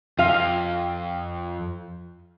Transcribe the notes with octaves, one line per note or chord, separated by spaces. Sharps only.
F2 F4 F5